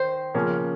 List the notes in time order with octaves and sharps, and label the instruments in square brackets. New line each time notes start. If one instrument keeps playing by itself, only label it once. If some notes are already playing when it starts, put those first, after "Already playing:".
Already playing: [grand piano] D#3 [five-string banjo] C5
[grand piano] C#3 F3 A#3 C#4